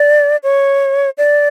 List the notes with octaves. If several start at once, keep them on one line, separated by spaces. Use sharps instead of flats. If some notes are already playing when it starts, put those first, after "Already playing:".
Already playing: D5
C#5
D5